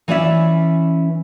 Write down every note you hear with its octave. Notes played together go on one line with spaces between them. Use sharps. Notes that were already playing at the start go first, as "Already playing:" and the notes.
E3 C#4 C#5 D5 E5